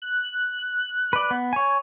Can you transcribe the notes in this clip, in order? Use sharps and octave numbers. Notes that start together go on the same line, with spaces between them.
F#6
B4 D5
B3
C#5 G#5